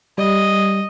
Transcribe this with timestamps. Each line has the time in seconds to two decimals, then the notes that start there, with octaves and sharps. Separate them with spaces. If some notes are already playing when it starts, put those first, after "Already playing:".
0.18 G3 D#5